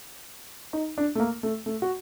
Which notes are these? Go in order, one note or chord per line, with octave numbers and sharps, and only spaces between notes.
D#4
D4
A3
A#3
A3
A3
F#4